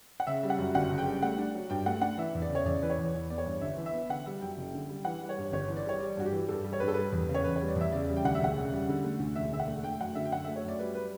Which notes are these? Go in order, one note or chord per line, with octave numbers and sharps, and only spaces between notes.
F#5
C#3 E5
G3
F#5
F#2
G1 F#5
C#3
G5
G3
A3 F#5
D4
F#3
G2 G5
A3 F#5
D4 F#5
E3 E5
E2
D5
C#3
C#5
E2 D5
E3 B4
C#5
E2
E3
B3 D5
C#5
G2
G1 E5
E3
E5
B3
D3 F#5
G3 E5
F#2 G5
F#1
D3
G3
E3 F#5
G3
C#5
G2
G1 C#5
E3
D5
G3 C#5
G3 D5
G2 F#4
G4
E3
G2 A4
G3
C#5
G2 B4
A4
G3 B4
E2
C#3
C#5
E2 B4
C#5
G3
D5
E2 E5
C#3 D5
G3
G5
D2 F#5
E5
E1 F#5
C#3
G3
D3
A3
D2
E1 E5
D3 E5
F#5
A3
A3 G5
F#2 F#5
D3 E5
G5
F#2 F#5
A3 E5
C#5
F#2 D5
G3 B4
B4